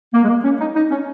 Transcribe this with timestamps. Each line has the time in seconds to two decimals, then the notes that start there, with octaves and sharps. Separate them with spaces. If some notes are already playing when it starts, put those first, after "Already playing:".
0.14 A#3
0.24 G#3
0.28 A#3
0.44 C#4
0.60 D#4
0.75 D#4
0.90 C#4